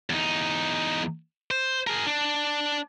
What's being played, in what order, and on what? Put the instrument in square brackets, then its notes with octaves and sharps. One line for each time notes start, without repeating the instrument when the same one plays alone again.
[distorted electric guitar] E2 D#4
C5
G#4 A#4
D4